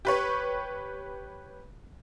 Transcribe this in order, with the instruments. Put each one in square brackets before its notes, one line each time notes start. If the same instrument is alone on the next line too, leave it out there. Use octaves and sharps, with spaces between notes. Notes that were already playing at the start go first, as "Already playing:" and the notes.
[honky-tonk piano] G4 B4 C#5